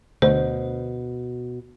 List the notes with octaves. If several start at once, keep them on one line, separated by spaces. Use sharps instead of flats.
D2 B2 C5